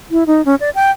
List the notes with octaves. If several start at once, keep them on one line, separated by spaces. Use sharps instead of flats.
E4
D#4
C#4
D5
G5